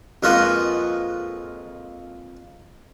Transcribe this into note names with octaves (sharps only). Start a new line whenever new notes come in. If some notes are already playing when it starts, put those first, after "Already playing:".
F2 G#3 A#3 F4 F#4 B4